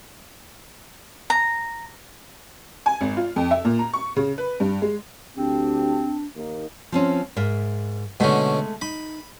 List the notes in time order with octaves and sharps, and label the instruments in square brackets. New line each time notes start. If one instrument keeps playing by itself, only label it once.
[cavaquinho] A#5
[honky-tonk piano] G#5
G#1
F4
F2
E5
A#2
A#5
C#6
C#3
B4
G2
G#3
[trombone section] D2 G4 [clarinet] C4 [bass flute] D4
[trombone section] D#2 A#3 D#4
[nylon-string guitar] F3 C4 C#4
G#2 A#4 E5
[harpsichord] B2 D3 C#4 [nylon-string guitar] G#3 A3 E5
[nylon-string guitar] D#4 [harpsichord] B5